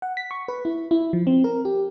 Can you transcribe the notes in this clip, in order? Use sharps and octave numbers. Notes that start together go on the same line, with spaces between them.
F#5
B6
C#6
B4
E4
E4
F3
C4
A#4
G4